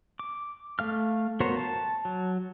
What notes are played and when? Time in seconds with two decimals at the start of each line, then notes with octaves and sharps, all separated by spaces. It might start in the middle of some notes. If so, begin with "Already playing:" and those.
0.19 D6
0.79 A3 F5 F6
1.40 B3 F#4 A#4 C5 C#5
1.57 A5
2.05 F#3